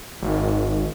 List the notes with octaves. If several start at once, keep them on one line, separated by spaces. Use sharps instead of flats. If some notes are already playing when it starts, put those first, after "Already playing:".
G#1